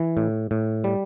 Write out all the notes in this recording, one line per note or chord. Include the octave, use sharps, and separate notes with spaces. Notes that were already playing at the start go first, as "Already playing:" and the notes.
Already playing: E3
A2
A2
G3